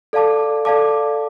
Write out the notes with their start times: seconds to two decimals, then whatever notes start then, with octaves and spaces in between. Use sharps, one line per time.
0.13 A4 D5 F5 A5 D6
0.65 A4 D5 F5 A5 D6